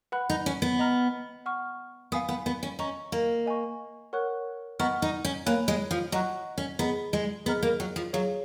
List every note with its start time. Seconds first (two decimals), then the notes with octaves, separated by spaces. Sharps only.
0.12 B4 F#5 B5 F#6
0.30 D#4
0.46 C#4
0.62 B3
0.79 D#5 A#5 F6
1.46 F#5 C#6 F6
2.12 B3 F5 G#5 D#6
2.29 B3
2.46 B3
2.63 C#4
2.79 C#4 D#5 A#5 C#6
3.12 A#3
3.46 D#5 G#5 C#6
4.13 A#4 C#5 F#5 C#6 F#6
4.79 B3 D#5 F#5 A#5 C#6 F6
5.02 D#4
5.25 C#4
5.46 A#3 C#5 G#5 B5 F#6
5.68 G#3
5.91 F3
6.12 F#3 D#5 F#5 A#5 C#6 F#6
6.58 C#4
6.79 B3 G#4 D#5 A#5
7.13 G#3
7.46 B3 G#4 D#5 A#5 F6
7.63 A#3
7.80 F#3
7.96 F3
8.13 F#3 G#4 C#5 F5